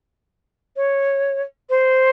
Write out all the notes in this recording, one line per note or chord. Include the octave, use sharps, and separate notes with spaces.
C#5
C5